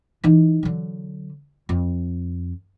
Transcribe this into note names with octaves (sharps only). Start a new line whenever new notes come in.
E3 D#4
D3 F#3
F2